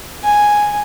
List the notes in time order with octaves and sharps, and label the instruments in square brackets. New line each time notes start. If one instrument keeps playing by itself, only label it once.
[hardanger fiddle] G#5